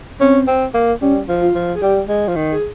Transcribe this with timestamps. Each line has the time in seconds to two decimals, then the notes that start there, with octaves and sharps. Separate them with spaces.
0.20 C4 C#4
0.47 C4
0.74 A#3
1.01 G3 C#4
1.29 F3
1.41 F4
1.55 F3
1.75 G#4
1.82 G3 G4
2.08 G#3
2.28 F3
2.36 D#3
2.51 G#4